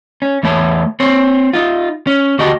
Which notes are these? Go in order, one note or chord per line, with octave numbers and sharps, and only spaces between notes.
C#4
E2 A3 C#5 A5
C4 C#5
D#4 F4
C#4
D2 F#4 G4 D#5 G5 A5